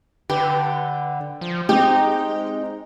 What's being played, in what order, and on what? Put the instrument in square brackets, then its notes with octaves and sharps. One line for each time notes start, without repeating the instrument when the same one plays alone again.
[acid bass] D3 [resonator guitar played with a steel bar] G4 [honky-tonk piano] B4
[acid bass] F3
[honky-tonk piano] G#3 C4 [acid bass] D#4 [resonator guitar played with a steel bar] G4